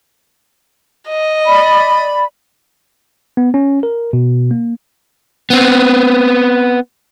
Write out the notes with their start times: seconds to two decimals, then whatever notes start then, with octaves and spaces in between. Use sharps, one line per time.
1.09 D#5
1.45 D5 B5
3.37 B3
3.54 C#4
3.83 A#4
4.13 B2
4.51 A#3
5.50 B3 C4